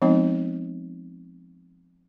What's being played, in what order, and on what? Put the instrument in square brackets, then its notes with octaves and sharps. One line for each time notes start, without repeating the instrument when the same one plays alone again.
[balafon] F3 G#3 B3 C4 D#4 D#5